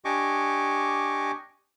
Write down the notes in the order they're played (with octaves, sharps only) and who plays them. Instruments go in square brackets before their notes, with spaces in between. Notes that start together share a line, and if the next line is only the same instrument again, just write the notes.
[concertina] D4 G4 D#5 G#5 C#6 D6